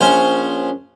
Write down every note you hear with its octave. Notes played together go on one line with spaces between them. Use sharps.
A#1 C#4 C5